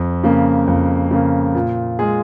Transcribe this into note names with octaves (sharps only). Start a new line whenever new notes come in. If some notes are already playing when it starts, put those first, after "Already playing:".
Already playing: F2
C#3 A#3
F2
C#3 A#3
A#2
G#3 F4 G#4